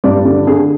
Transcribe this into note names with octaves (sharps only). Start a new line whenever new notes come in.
G2 D5
D3
D3 G#4